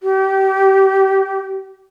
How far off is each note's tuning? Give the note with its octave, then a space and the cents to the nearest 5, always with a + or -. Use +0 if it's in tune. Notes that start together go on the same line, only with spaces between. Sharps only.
G4 -25